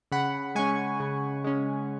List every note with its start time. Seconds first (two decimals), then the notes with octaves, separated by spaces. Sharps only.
0.12 C#3 F#5 B5
0.55 G#3 C#4 G#5 C#6
1.00 C#3
1.44 G#3 C#4